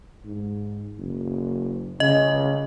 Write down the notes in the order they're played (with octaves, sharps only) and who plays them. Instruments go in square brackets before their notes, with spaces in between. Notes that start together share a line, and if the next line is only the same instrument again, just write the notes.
[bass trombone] G#2
F#1
[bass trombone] C#3 [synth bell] D#5